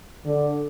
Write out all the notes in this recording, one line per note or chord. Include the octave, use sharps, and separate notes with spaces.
D3